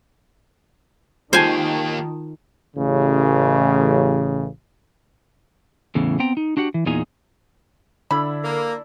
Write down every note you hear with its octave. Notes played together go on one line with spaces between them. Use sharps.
D#3 A#3 F4 G4 C5 G#5 A5
A1 C#3
E2 A2 C#3 E3
B3 C4 G5 A#5
D#4
D4 F#4 G4 F#5
E3
E2 A#2 D#4 G#4 G#5 A#5
D3 D4 E4 A4 B5
A#3